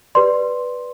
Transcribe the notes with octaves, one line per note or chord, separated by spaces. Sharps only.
G4 B4 D5 C6